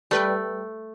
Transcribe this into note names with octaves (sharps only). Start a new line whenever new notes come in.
G3 A3 B4 G5